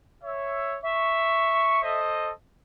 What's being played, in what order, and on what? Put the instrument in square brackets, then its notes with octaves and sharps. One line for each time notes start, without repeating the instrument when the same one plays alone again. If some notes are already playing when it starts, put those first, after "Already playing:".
[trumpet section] C#5 E5
[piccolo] E5 [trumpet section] C#6
[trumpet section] A4 C5 D#5